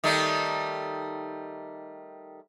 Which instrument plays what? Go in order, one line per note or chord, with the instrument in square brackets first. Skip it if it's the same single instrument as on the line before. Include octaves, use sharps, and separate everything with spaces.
[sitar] D#3 G3 A3